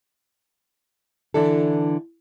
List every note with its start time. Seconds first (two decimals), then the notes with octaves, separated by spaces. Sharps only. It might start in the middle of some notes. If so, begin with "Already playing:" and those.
1.34 D3 E3 D4 E4 A4